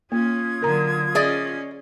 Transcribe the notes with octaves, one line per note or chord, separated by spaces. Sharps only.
A#3 C#4 F4 D#6 G#6
D3 F#3 A#4 A#5
C#4 G#4 D5 D#5